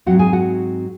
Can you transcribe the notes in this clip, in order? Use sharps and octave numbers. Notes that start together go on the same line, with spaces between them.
G#2 F#3 C4 F#4 F#5
G#4 G#5
F#4 F#5